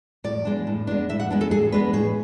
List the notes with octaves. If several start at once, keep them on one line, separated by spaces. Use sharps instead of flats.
A2 D5
G#3 B3 D4
A2
G#3 B3 D4
A2 E5
F#5
G#3 B3 D4
A4
A2 G#4
G#3 B3 D4 B4
A2 G#4